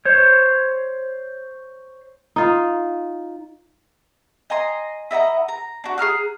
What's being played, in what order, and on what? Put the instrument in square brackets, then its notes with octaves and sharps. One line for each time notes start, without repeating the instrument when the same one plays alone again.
[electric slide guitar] C5 C#5
[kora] D#4 F4
[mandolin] D#5 G#5 A#5 C6
E4 D#5 F#5 A#5
A#5
D4 F#4
G#4 A#5 F6 F#6